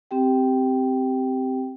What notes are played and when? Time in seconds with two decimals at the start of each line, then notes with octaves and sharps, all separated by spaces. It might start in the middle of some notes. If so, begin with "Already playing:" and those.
0.11 C4 G4 G5